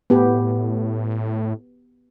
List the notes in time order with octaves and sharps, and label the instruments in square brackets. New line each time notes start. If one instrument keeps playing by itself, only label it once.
[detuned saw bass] A2 [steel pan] B3 G4 B4